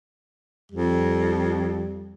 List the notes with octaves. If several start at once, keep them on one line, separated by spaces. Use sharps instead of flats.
F2 G3